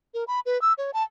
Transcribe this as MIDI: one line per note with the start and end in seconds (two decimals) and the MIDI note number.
0.14 0.24 70
0.28 0.40 83
0.46 0.61 71
0.62 0.73 88
0.78 0.91 73
0.94 1.03 81